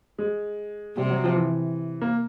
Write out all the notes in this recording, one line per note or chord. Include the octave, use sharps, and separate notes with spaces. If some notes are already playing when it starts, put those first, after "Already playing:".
G#3
C3 G3
F#3
F3
E3
A#3